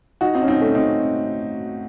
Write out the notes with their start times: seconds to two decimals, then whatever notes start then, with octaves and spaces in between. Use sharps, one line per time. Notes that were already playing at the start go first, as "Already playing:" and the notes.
0.21 D#4 F#4
0.35 C4 D#4
0.43 C#4
0.48 C4 D#4
0.61 A3 C#4
0.75 C4 D#4